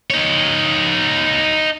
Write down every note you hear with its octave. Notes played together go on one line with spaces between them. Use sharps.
D#4 C#5